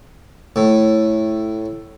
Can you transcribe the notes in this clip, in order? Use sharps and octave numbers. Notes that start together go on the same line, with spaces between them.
A2